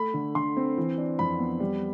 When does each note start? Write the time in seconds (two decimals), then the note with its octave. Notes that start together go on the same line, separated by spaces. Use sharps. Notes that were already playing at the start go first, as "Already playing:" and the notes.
Already playing: A3 B5
0.14 D3
0.35 D3 C6
0.57 C4
0.78 E3
0.98 D4
1.19 F2 B5
1.39 B3
1.60 G3